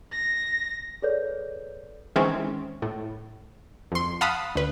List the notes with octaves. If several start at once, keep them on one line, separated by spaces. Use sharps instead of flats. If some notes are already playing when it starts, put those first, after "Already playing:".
A#6
G#4 A4 B4 C#5 D5 G6
D#3 E3 G#3 C4 C#4
A2
F2 C6
F5 F#5 A5 B5 D#6
D2 B4